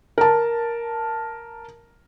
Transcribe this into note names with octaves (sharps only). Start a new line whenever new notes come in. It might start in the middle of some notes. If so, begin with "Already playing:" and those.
A#4 A5